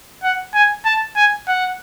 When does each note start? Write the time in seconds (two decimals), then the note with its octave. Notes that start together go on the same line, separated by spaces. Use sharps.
0.23 F#5
0.55 G#5
0.85 A5
1.16 G#5
1.48 F#5